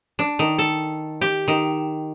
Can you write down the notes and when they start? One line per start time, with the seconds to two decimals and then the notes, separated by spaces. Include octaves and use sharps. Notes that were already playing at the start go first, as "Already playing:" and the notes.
0.19 D4
0.39 D#3
0.58 A4
1.21 G4
1.48 D#3